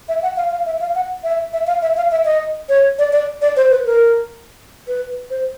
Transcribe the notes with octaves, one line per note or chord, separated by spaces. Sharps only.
E5
F#5
F5
F5
E5
F5
F#5
E5
E5
F5
E5
F5
E5
D#5
C#5
D5
D5
D5
C5
B4
A#4
B4
C5